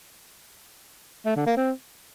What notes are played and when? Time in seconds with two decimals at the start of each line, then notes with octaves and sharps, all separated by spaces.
1.26 A3
1.36 D3
1.46 A#3
1.57 C4